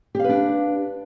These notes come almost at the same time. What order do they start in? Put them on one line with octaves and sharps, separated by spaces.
G4 F5 B4 D4